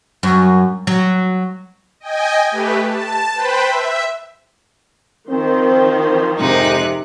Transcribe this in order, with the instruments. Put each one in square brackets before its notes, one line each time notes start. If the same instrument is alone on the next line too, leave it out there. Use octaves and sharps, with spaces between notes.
[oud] F#2
F#3
[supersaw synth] D#5 G5 G#5
A3 G4 B4
A5
B4 C5 G5 B5
E5
[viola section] D#3 F3 C5 [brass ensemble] C4
[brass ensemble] F2 G#2 [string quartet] C3 D#4 F#6